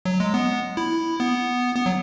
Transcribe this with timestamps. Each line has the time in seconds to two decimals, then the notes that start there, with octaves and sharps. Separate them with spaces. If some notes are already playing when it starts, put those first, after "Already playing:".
0.05 F#3
0.20 G#3
0.34 B3
0.77 E4
1.20 B3
1.76 B3
1.86 F#3